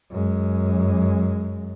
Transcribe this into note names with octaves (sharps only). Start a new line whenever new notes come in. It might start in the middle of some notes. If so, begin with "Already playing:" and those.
F#2 G#3